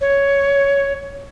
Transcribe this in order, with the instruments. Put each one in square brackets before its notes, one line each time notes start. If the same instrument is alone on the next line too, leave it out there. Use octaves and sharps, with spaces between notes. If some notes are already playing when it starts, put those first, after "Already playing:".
[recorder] C#5